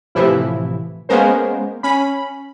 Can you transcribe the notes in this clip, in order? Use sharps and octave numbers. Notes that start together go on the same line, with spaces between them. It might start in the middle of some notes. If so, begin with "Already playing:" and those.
A2 C3 E3 F3 E4
G#3 A#3 B3 C#4 A#4 C5
C#4 B5